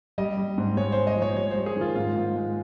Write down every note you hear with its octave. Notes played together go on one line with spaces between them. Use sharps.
G3 D#5
G3
G#2
G#3 C#5
G#3 C5
D#5
F3 C#5
G3 C#5
C5
G3
G#4
D#3 F4
G#2 F4
G#2
G#3